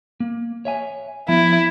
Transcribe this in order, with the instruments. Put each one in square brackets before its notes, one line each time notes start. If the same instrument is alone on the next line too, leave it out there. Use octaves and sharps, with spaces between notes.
[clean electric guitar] A#3
C#5 E5 G#5
[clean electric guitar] F3 B3 [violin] E4